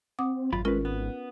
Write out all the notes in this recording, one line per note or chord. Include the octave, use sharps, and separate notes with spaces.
C4 F#5 D6 D#6
G#1 F#2 F4 B5
G#3 C#4 F4 A#4 B4
B3